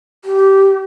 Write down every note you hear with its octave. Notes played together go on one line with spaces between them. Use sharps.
G4